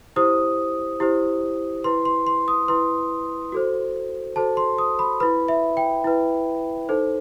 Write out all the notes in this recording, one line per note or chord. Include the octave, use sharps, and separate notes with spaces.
E4 G4 C5 D#6
E4 G4 C5
E4 B4 C6
C6
C6
D#6
E4 B4 C6
F#4 A4 C5
F#4 A4 C5 A5
C6
D#6
B5
E4 B4 B5
E5
G5
E4 B4
D#4 A4 C5